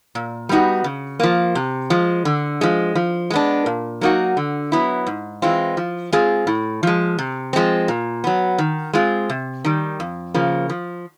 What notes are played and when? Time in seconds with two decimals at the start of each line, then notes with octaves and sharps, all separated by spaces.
0.15 A#2
0.49 G3 B3 D#4 F#4
0.84 C#3
1.20 F3 A#3
1.55 C3
1.90 F3 G#3
2.25 D3
2.61 F3 G#3
2.95 F3
3.30 G#3 B3 D4
3.66 A#2
4.01 F#3 A#3 D#4 F#4
4.37 D3
4.72 F#3 B3 E4
5.07 G#2
5.42 E3 G#3 C4 F4
5.77 F3
6.12 G#3 C4 F4 G#4
6.47 A2
6.83 F3 G#3
7.18 C3
7.53 F3 G#3 C4
7.88 A#2
8.24 F#3 B3
8.58 D#3
8.93 G#3 C4 F4 G#4
9.29 C3
9.64 D#3 G3
10.00 F2
10.34 C#3 F3 A#3
10.69 F3